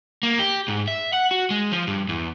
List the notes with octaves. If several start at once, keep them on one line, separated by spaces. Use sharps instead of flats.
A#3
G4
G#2
E5
F#5
F#4
G#3
F3
G2
E2